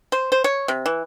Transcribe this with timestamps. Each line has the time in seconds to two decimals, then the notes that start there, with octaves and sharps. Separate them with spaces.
0.12 C5
0.32 C5
0.44 C#5
0.68 C3
0.86 E3